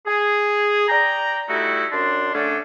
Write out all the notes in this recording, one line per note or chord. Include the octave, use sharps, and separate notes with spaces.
G#4
D5 G5 A#5
G3 A3 D#4 E4 F#4
F#2 D4 A5 C6
D3 A3 C#4 D4